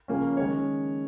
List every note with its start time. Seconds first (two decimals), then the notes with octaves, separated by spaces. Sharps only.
0.08 C#3 F3 A#3 C#4
0.37 D#3 G#3 C#4 C#5